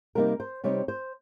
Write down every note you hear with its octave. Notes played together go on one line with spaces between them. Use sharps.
C3 G3 A#3 D#4 A#4
C5
C3 G3 C4 D#4 C#5
C5